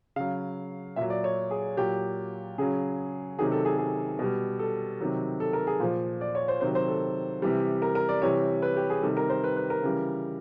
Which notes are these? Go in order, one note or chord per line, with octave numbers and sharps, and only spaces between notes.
C#3 F#3 F5
A#2 F#3 E5
D5
C#5
G#4
A#2 F#3 G4
C#3 F#3 G#4
C3 D#3 F#3 G#4
A4
G#4
G#4
B2 G3
A4
C3 D#3 F#3
A4
A#4
G#4
A#2 F3
D5
C#5
C5
C3 D#3 F#3 C5
C5
A4
C3 E3 G3
A#4
A#4
D5
C3 E3 G3 C#5
B4
G4
G#4
C3 D#3 G3 A4
A#4
C5
B4
B4
A#4
C#3 E3 G3